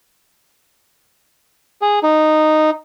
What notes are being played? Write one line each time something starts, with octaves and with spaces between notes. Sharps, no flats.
G#4
D#4